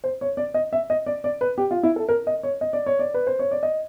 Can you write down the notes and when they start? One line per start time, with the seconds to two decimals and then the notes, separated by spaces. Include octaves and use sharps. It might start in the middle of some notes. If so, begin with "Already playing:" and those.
0.04 C5
0.21 C#5
0.37 D5
0.54 D#5
0.73 E5
0.90 D#5
1.06 D5
1.24 D5
1.41 B4
1.58 G4
1.71 F4
1.83 E4
1.96 A4
2.09 A#4
2.27 D#5
2.43 C#5
2.61 D#5
2.73 D5
2.86 C#5
2.99 D5
3.14 B4
3.27 C5
3.39 C#5
3.51 D5
3.63 D#5